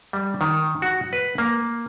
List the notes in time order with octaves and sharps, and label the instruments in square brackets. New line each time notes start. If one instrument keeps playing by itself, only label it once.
[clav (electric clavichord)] G3
D#3
F#4
B4
A#3